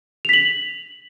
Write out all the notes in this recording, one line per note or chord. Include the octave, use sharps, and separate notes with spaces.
B6 F7 F#7